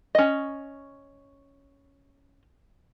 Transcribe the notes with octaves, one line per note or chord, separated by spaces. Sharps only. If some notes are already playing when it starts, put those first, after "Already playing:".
C#4 D#5